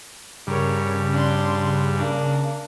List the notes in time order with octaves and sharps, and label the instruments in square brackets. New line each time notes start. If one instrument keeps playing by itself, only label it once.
[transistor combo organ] G2 [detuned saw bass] C#3 [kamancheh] A#4 C#5
[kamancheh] D4 C6
A#3 D4